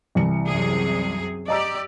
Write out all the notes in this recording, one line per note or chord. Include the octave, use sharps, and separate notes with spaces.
C2 E3 C#7
F#2 C3 G#4
G4 D5 D#5 A#5 E6